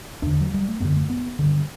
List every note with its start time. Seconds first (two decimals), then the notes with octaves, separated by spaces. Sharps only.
0.22 E2 D3 D4
0.41 F#3
0.54 G3
0.68 A3
0.80 F#2 D3 B3
0.96 A3
1.10 B3
1.39 G2 D3